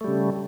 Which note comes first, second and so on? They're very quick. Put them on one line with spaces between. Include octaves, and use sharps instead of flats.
A3 G3 C#3